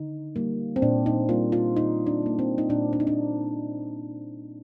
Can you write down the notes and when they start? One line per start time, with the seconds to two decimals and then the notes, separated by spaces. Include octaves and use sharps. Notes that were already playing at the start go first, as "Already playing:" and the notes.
Already playing: D3 D#4
0.36 G3 A#3
0.76 C4
0.82 A#2 D4
1.06 D#4
1.29 G3 A#3 F4
1.52 F4
1.76 A#2 D#4
2.07 D4
2.22 G3 A#3
2.39 C4
2.58 D#4
2.69 A#2 D4
2.93 D4
3.00 D#4
3.07 D4